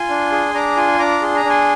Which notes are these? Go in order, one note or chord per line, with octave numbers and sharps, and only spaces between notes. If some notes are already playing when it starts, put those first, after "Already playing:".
Already playing: F4 G#5 C6
D4
G#4
D4 A#5 D6
F4 G#5 C6
D4 A#5 D6
G#4 C6
A#5
D4 G#5 C6